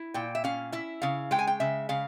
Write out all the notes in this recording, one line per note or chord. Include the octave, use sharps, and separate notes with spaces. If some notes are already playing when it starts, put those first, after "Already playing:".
Already playing: E4
A#2 G5
E5
C#4 F5
E4 E5
C#3 F5
G#3 G5
G#5
G5
C#3 E5
C#3 F5